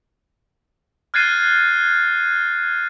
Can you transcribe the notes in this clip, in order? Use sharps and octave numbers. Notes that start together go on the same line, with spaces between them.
F6 F#6 G#6 A6 C7 D#7